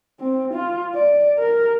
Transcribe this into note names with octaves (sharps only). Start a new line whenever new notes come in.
C4
F4
D5
A#4